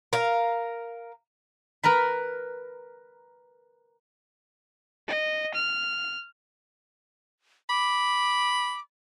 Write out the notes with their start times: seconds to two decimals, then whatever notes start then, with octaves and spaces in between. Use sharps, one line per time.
0.13 A#4 F5
1.83 A#4 B4 A#5 B5
5.08 D#5
5.54 F6
7.69 B5 D6